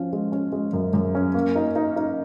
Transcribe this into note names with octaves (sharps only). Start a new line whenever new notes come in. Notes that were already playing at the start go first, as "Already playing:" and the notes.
Already playing: F3 C#4
G#3
C#4
G#3
F#2
F#2
C#4
A#3
D#4
D#4
D#4